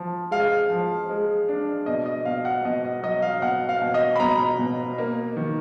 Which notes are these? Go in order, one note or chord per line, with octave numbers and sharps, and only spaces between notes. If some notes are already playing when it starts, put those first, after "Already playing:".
Already playing: F3
G#3 F5
F3
G#3
D4
B2 D#5
D#5
B2 F5
F#5
B2 D#5
D#5
F#3 D#5
F5
B2 F#5
F5
B2
D#5
B5
B2 A#5
B2
A#3
D#3